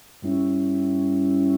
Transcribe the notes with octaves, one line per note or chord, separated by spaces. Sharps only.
G2 G3 C#4 E4